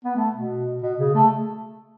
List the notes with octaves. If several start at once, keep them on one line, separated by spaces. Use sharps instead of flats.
B3
A3
B2
B2
C#3
A3